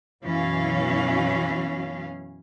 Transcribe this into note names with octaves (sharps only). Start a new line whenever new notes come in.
F#2 B2 E3 C#4 F5